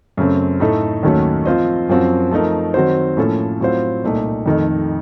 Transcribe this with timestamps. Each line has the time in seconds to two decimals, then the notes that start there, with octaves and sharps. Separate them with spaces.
0.17 F#2 C#3 A3 C4
0.60 A2 A3 D#4 A4
1.03 D#2 D#3 F#3 A3 C#4
1.45 F3 C4 F4 C5 D#5
1.89 F#2 F3 C4 F#4
2.31 F3 A3 C4 D#4 A#4
2.74 D#3 F#3 C4 F#4 C5
3.17 A2 F3 A#3 C#4 A4
3.60 A2 F#3 C4 F4 C5
4.03 C2 A#2 A3 D#4
4.46 F2 D#3 A3 D#4